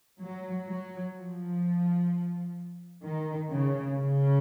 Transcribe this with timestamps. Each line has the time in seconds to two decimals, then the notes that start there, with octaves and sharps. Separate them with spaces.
0.21 F#3
0.68 F#3
1.15 F3
3.03 D#3
3.50 C#3
3.98 C#3